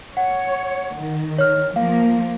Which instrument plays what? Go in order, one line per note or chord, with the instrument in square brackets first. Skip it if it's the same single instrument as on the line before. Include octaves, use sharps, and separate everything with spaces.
[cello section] C#5 [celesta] F#5
[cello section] D#3
[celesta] C#5 F6
[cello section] F3 A#3 [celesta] F5